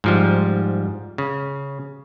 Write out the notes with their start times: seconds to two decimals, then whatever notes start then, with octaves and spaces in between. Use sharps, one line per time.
0.04 G#2 F3 G3
1.18 C#3